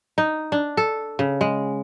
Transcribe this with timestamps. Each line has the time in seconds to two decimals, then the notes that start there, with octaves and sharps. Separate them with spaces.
0.18 D#4
0.52 D4
0.77 A4
1.19 C#3
1.41 G#3